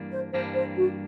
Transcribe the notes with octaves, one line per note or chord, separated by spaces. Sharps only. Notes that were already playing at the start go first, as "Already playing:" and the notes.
Already playing: G2 E3 G3 A#3 D4
C5
G2 E3 G3 A#3 D4 C5
C5
F#4